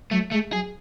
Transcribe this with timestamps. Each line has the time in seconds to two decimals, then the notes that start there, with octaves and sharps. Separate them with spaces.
0.11 F#3 A3
0.31 G#3 A3
0.53 F#3 G#4